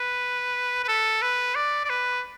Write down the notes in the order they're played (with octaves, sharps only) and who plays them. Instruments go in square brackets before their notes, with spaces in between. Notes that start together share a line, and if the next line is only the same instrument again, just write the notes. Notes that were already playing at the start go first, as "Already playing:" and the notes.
Already playing: [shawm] B4
B4
A4
B4
D5
D5
B4